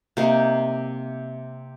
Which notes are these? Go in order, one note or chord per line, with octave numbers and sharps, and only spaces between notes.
C3 A#3 D#4